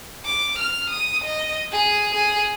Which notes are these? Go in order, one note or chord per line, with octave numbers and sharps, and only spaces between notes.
D6
F6
D#6
D#5
G#4
G#4